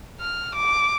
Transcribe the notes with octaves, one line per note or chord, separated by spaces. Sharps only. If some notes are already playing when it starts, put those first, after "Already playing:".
F6
D6